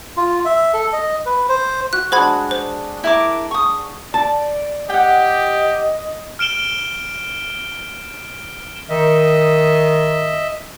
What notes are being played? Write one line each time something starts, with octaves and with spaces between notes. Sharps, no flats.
F4
E5
A4
D#5
B4
C5
F#4 F#6
G#3 D4 F#4 C5 B5 G#6
C5
E4 A#4 D6
C#6 D#6
D5 A5
G4 D#5 F#5 G5
F6 D7 E7 G7
D#3 D#5 E5